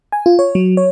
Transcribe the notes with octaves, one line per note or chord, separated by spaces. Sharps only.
G#5
F4
C#5
F#3
C#5